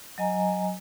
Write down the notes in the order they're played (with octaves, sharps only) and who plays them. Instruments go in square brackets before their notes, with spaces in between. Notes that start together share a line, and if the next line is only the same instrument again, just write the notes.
[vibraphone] F#3 D#5 G#5 A#5